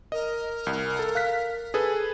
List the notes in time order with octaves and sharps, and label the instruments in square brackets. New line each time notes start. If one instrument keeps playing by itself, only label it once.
[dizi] A#4 [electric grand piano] D#5
[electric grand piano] C2
A4
F5 F#6 B6
G#4 A4 B4